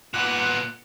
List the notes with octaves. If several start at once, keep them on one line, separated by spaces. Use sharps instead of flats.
A#2 B3 F#6